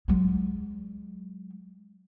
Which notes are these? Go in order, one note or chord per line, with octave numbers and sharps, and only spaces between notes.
F#3 G#3